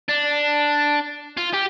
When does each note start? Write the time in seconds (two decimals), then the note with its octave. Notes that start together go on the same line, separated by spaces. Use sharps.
0.09 D4
1.38 F4
1.54 G4